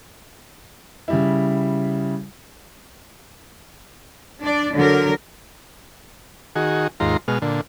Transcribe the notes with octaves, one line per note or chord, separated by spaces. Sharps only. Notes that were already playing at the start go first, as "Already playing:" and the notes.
C#3 G3 E4
D4 D5
D3 F#3 A#4
D#3 F#4 G#4
D#2 G#2 F4 A#5 C6
B2 G#3 F6
A#2 D3